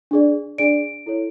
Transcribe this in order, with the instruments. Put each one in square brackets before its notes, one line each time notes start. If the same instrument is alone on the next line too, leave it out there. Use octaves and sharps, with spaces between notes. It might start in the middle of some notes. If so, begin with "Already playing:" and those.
[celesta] D4 G#4 D5
D4 G#4 D5 D7
E4 A4 C#5